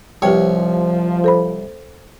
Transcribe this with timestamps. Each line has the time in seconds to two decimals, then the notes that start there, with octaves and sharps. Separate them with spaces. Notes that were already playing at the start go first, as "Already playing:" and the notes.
0.22 C2 F3 G4 B4 C#5 G5
1.24 A4 C5 B5